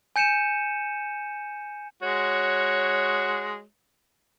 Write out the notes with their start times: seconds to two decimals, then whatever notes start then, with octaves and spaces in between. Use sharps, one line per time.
0.16 G#5 G6 C#7 D#7 E7
2.03 G#3 F#4 C#5